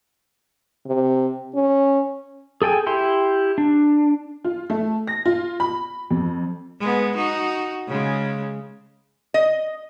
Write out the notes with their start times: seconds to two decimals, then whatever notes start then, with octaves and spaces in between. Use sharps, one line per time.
0.86 C3
1.55 C#4
2.62 G#4 A4 G5 G#5
2.86 E4 G4 C6
3.58 D4
4.45 F4
4.70 A3
5.07 A#6
5.26 F4
5.60 B5
6.11 F2
6.80 G#3 B3
7.17 D#4 F#4
7.88 C#3 G#3
9.34 D#5